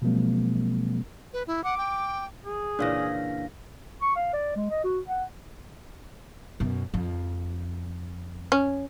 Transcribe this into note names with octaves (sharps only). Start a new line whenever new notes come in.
B2 F3 F#3 G#3 A#3 C4
B4
E4
F#5 D6
G5
G#4
A#2 C#3 E3 D4 F5 A#6
C#6
F5
D5
G#3
D#5
F#4
F#5
F#2 B2
F2
C#4